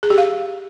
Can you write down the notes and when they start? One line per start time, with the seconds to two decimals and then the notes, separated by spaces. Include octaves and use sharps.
0.03 G#4
0.10 G4
0.18 F5